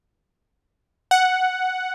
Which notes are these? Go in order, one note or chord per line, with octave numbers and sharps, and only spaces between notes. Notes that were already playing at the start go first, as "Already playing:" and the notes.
F#5